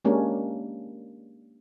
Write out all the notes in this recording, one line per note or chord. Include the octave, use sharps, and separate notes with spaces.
G#3 A#3 C#4 D4 G4 A#4